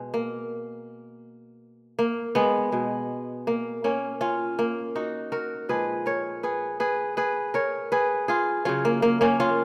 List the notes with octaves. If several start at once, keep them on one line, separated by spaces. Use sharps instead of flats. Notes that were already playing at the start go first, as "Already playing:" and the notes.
Already playing: B2 G#3
A#3
A#3
G#3 B3
B2 G#3
A#3
A#3 C#4
C#4 F4
A#3
D#4 F#4
F#4 A#4
A#2 F3 G#3 G#4 B4
A#4 C#5
G#4 B4
G#4 B4
G#4 B4
A#4 C#5
G#4 B4
F4 G#4
C#3 F#3 C#4 F4
A#3
A#3
A#3 C#4
C#4 F4